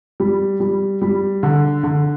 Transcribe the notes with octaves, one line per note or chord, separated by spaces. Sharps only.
G3
G3
G3
D3
D3